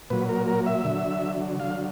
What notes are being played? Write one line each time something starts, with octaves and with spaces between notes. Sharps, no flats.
A#2 F#3 B4
A#4
A#4
E5
D3 F#3
D3 F#3 F5